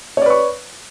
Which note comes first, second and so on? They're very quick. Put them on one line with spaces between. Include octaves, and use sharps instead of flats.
C#5 D5 B4 C#6